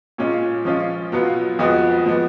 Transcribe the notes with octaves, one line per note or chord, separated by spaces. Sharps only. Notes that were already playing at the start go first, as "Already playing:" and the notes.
A#2 G#3 C#4 F4
F3 G#3 C#4 F4
B2 F#3 B3 F4
F2 F3 G#3 B3 F#4
F3 G#3 B3